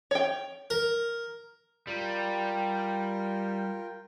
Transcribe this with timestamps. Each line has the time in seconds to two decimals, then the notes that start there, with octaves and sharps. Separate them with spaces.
0.11 C#5 G5
0.70 A#4
1.87 G3 F4 A#4 G5